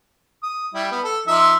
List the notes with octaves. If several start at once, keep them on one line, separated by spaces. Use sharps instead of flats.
D#6
G3 E4
B3
A4
F3 D#4 E5